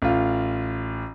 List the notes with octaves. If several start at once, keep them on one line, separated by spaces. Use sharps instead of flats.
A1 F4